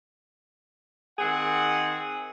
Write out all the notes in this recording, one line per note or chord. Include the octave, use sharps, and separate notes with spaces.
D#3 C4 G#4 F#5